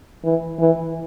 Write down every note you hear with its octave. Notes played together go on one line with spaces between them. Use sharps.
E3
E3